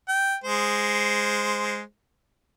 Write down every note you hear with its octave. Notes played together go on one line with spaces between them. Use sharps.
G5
G#3 C5